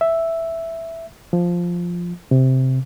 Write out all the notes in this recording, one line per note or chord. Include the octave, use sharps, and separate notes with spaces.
E5
F3
C3